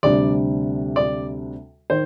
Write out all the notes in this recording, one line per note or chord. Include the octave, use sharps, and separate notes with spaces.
D2 C3 G3 D4 D5
D5
D#3 C5